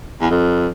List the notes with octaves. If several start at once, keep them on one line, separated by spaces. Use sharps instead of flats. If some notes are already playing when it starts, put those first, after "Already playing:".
E2
F2